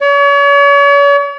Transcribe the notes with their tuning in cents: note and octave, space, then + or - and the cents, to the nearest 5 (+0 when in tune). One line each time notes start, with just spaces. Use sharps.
C#5 +40